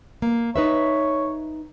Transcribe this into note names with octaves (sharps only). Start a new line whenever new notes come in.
A#3
D#4 B4 C#5 E5